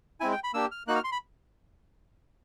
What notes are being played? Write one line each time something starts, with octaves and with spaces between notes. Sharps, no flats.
G#3 C4 E4 G#5
G5
B5
A#3 D4 G4 E6
F6
A#3 D#4 F#4 F#6
F6
C6
B5